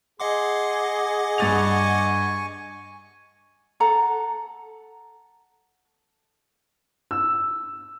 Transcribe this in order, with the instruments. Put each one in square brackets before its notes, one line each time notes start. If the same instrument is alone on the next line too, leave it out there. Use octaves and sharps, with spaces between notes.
[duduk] G#4 [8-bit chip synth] D#5 F#5 D6 [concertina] C6
[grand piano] G2 A6 F7 [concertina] G#5 C#6
[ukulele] A4 F#5 A#5
[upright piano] E6